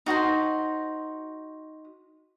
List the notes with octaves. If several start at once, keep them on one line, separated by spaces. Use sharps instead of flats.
D#4 F#4 C5 C6